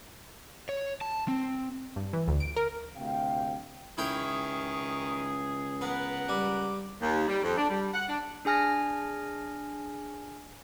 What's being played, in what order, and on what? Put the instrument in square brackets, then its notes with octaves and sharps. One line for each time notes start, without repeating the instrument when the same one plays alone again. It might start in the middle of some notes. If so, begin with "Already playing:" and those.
[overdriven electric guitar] C#5
A5
C4
[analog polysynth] G2
E3
D2
D7
A#4
[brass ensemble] D2 C3 F5 G5
[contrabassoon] C#2 [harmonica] D#3 C#6 [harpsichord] E4 A#4 G5 [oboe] G#4
[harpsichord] B3 [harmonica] A#4 B4 F#5
[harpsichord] G3 [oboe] D6
[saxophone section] D#2
G3
F2
D4
G3
F#5
D4
[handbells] D4 G#4 G#5 F6 A#6